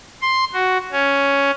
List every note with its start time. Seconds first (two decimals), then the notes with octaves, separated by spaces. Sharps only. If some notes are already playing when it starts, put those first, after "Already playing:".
0.22 C6
0.53 F#4
0.92 C#4